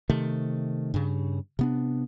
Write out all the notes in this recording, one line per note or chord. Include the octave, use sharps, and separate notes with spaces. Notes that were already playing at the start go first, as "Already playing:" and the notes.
C3 D#3 A3
G2 C#3
C3 B3 D4